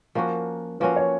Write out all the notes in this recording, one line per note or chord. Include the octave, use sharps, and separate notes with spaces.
F3 A#3 C#4 F#4 A#4
F3 A#3 C#4 F#4 B4
C#5